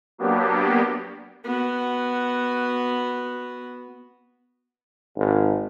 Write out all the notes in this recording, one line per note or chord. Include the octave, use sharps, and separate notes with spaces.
F#3 A#3 B3 D4 G4
B3 F#4
G#1